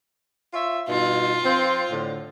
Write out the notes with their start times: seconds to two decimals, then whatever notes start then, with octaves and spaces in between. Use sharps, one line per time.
0.53 F4 C#5 E5
0.89 G2 B2 D#4 F4
1.44 F3 C4
1.91 A2 D3